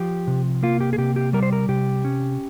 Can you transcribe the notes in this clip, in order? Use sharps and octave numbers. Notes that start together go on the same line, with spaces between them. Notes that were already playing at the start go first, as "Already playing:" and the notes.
Already playing: F3 G4
C3
A#3 F4
G4
G#4
C3 G4
G4
G3 A#4
C5
A#4
C3 G4
C#4